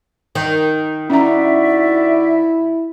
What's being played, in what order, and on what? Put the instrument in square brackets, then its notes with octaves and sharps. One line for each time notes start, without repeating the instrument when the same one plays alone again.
[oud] D#3
[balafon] C#4 A#5 [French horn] E4 [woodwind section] F#4 D5 E5